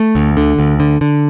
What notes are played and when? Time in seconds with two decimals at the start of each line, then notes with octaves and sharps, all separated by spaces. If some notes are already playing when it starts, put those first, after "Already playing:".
Already playing: A3
0.15 D2
0.37 D3
0.59 D2
0.80 D3
1.01 D3